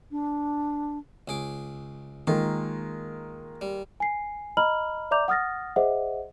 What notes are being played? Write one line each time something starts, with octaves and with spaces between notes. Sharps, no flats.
D4
C#2 G#4 D6
D#3 G#3 A#3 F4
G3
G#5 C7
D#5 A#5 B5 F6 F#7
D5 E5 A#5 D6 G6 F7
F#5 D#6 F6 A6 A#6
G#4 C5 D#5 E5 F#5